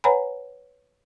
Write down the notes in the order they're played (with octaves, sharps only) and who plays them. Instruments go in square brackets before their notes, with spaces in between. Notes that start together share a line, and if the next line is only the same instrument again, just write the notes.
[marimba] B4 C#5 F#5 G#5 A#5 B5